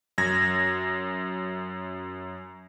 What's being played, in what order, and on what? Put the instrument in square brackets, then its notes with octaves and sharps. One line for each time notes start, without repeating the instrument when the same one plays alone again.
[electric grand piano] F#2 G#6 A#6